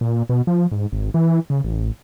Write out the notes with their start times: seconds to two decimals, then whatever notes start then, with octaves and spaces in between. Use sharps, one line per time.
0.01 A#2
0.29 B2
0.47 F3
0.72 G#2
0.92 G#1
1.14 E3
1.50 C#3
1.65 A1